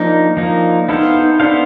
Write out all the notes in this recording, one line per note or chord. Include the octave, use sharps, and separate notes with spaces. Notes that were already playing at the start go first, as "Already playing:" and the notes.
Already playing: F3 A#3 D4 D#4
F3 A#3 D#4
B3 D#4 E4 A4 C5 F5
D#4
B3 D4 E4 A4 C5 F5